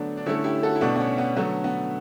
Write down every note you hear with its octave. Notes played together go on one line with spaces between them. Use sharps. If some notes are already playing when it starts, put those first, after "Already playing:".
Already playing: D3 F#3 A3 B3 D4
D4
D3 A3 C#4 E4
E4 G4
F#4 A4
E4
B2 A3 B3 D4
B3
C#4
B3
D3 F#3 A3 B3
B3